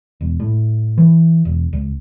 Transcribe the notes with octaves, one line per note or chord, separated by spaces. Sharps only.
E1
A2
E3
E1
C#2